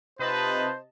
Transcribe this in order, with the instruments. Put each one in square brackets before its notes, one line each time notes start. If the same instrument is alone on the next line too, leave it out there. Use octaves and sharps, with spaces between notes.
[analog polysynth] C3 D#5 A5 [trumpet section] D#4 F4 B4 [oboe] C5